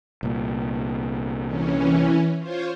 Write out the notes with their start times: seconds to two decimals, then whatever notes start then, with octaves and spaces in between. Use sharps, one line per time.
0.23 C2 A#2
1.46 E3 C#4
2.39 F4 C5 C#5